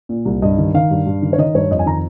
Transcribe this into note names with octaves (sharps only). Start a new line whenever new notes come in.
A#2
C2
G2 D#5
D#3
D#3 F5
G2
G2
D#3
C#5
D#3 D#5
G2 C#5
F2 D#5
G#5
D#3 A#5